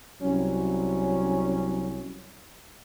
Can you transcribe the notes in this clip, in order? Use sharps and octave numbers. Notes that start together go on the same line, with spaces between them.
C2 F#3 C#4